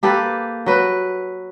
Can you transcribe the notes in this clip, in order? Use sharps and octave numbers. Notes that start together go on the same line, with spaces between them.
A#3 G4 A4 B4
F#3 B4